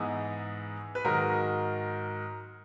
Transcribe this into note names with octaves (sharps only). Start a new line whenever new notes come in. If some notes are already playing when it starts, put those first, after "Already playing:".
Already playing: G#2 E3 B3 D#4 G#4
B4
G#2 D#3 F#3 A#4